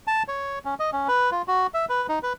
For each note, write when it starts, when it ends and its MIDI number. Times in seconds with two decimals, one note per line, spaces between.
0.07 0.23 81
0.28 0.59 73
0.65 0.75 61
0.80 0.90 75
0.93 1.08 61
1.08 1.30 71
1.31 1.42 65
1.48 1.67 66
1.74 1.85 76
1.89 2.07 71
2.09 2.19 63
2.23 2.33 71